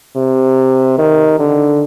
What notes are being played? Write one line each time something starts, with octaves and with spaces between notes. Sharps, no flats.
C3
D#3
D3